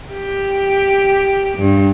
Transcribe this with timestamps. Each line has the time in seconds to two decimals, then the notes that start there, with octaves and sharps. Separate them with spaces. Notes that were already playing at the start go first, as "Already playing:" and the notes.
0.13 G4
1.57 G2